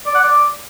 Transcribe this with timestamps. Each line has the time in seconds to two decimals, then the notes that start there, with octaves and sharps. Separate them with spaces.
0.06 D5
0.15 F#5
0.23 D5